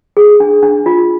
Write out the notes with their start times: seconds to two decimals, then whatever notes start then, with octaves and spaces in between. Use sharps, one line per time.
0.17 G#4
0.40 D4
0.63 D4
0.86 F4